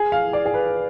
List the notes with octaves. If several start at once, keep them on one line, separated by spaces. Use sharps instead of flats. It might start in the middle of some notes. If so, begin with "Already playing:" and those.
Already playing: G#4
F5
D5
G#4
B4